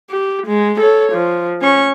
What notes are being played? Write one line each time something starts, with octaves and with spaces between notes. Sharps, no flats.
G4
G#3
A4 C#5
F3
C#4 C#6